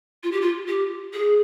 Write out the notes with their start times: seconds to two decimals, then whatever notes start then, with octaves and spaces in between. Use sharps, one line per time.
0.23 F4
0.31 G4
0.41 F4
0.68 G4
1.13 G#4